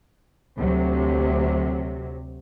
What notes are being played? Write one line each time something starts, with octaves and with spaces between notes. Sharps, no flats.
D2 C3 F#3